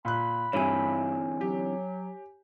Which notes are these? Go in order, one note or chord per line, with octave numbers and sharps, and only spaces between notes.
A#2 B5 F#6
G2 D3 E3 C4 E4 C#5 G#5
F#3 G4